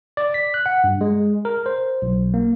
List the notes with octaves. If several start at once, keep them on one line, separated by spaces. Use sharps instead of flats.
D5
B6
F#6
F#5
G2
G#3
A#4
C5
B1
A#3